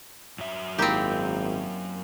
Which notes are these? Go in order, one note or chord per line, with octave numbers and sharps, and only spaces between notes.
F#2 F#3 E5
G#1 A#3 C4 D#4 E4 G4